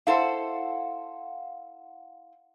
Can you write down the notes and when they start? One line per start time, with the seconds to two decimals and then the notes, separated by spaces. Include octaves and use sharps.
0.07 E4 A4 C5 F5 F#5